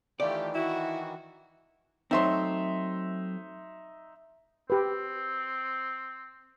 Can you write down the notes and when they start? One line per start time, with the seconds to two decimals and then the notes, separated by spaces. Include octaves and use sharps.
0.20 D#3 E3 A3 F4 G4 D5
0.55 E4 F#4
2.11 F#3 A3 C4 D#4 E5 C6
4.70 C4 G4 B4